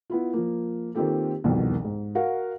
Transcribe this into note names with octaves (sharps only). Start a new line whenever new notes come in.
B3 E4 F4
F3 A#3
D#3 A#3 C4 F4 G4 A4
E1 C2 F2 B2 D#3
G#2
F#4 A#4 F5 F#5